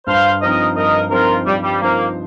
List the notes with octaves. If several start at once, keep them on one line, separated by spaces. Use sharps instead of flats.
G2 C5 F5
F3 C4 D#4 A#4 C5 D#5
G2 A#4 D#5
F3 C4 D#4 F4 A#4 C5
G2 G3
G3
F3 A#3 C4 D#4 C5